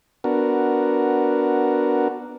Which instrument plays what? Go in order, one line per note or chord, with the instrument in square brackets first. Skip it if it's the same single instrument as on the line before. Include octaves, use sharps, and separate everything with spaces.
[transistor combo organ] B3 D4 F#4 A#4